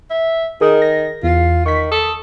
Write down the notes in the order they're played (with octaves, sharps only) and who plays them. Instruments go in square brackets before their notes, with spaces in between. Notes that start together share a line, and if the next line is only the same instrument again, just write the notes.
[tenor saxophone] E5
[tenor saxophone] D#3 [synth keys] G#4 A#4 D#6
[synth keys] A#6
[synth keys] E2 [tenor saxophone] F4
[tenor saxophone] D#3 [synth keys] C#6 B6
[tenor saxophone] A4 [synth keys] D#6